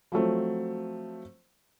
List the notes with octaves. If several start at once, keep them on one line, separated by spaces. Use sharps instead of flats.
F3 F#3 A3 C4